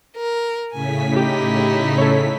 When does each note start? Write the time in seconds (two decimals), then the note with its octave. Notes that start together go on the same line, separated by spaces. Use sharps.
0.17 A#4
0.72 A2 C#3 G#5 B6
1.16 D#4 E4 G4
1.98 A4 C#5